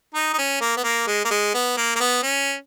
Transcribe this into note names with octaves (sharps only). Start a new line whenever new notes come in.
D#4
D#4
C#4
A#3
B3
A#3
G#3
A#3
G#3
B3
A#3
A#3
B3
C#4